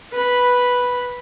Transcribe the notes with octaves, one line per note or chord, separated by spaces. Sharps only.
B4 B5